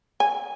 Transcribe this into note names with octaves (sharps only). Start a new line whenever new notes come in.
G#5